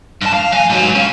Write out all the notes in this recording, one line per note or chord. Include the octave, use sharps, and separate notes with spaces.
G2 A5
F5
F#3 G#5
G#2 F#3
C#4 F5